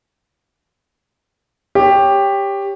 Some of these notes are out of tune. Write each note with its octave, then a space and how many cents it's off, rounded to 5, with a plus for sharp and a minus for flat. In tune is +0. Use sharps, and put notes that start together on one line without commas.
G4 +10 C#5 +0